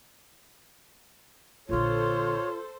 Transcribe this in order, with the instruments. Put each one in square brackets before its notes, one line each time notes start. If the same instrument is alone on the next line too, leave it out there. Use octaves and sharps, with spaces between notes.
[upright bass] A#1 D3 [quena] F4 [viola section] A4 C5 [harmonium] C#5